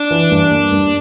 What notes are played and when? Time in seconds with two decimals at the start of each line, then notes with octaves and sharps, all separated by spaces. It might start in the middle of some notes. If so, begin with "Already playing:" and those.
Already playing: D4
0.11 E3
0.31 G2
0.51 A#3
0.72 G2